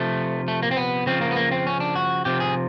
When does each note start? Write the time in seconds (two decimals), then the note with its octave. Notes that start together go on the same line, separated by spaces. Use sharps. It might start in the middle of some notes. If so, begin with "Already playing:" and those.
Already playing: C3 F3 A3
0.48 A3
0.62 A#3
0.71 C4
0.77 B3
1.06 C#3 F3 C4
1.21 A#3
1.31 B3
1.36 A#3
1.51 C4
1.67 C#4
1.80 D4
1.95 F#4
2.25 C3 F3 G4
2.40 G#4